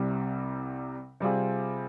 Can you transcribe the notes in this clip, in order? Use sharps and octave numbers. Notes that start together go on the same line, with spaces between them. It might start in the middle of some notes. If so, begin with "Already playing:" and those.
Already playing: C2 C3 G3
C3 G3 C4 F4 G#4